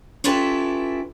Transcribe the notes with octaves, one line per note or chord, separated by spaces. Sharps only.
C#4 E4 F4 G4 A4 B4